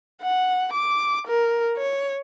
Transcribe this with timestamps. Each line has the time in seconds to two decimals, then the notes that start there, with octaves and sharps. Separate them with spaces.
0.22 F#5
0.73 D6
1.28 A#4
1.77 C#5